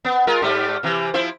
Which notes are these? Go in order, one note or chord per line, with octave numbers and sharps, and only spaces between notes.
B3
G#3 F4 A#4
G#2 G3 A3
C3 E3
F3 E4 C5